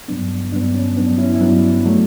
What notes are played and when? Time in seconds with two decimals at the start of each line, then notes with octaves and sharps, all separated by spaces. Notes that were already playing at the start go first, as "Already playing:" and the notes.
0.08 G2 F#3 B3 D4
0.52 G2 F#3 B3 D4
0.75 C#4
0.96 G2 F#3 B3 D4
1.18 C#4 E4
1.35 E4
1.41 G2 F#3 B3 D4
1.85 F#3 A3